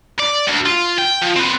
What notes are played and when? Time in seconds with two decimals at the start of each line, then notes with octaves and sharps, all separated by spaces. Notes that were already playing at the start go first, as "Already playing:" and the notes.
0.19 D5
0.47 D2
0.66 F4
0.98 G5
1.21 F3
1.36 C4 B4